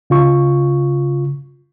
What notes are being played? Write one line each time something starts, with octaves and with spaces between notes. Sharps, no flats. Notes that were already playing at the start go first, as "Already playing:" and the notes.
C#3 F4 C#6